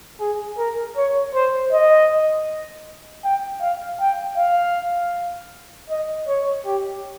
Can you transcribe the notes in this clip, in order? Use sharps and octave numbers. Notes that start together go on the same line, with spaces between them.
G#4
A#4
C#5
C5
D#5
G5
F5
G5
F5
D#5
C#5
G4